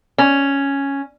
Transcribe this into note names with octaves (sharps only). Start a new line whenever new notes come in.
C#4